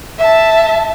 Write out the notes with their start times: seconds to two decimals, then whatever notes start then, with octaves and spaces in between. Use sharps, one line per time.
0.19 E5 A5